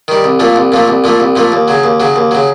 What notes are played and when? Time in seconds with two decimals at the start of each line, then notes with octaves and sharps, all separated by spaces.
0.08 D#3 G3
0.24 C2
0.40 A#2 F3 A3
0.56 C2
0.72 A#2 F3 A3
0.88 C2
1.04 A#2 F3 A3
1.20 C2
1.36 A#2 F3 A3
1.52 D#2
1.68 C#3 F#3
1.83 D#2
2.00 C#3 F#3
2.16 D#2
2.31 C#3 F#3